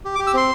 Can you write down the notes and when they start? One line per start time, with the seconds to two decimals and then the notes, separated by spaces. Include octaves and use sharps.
0.05 G4
0.15 D6
0.19 G4
0.27 E6
0.34 C4 C6